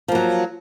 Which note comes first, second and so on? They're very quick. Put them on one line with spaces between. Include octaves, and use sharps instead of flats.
F3 A#3 F#3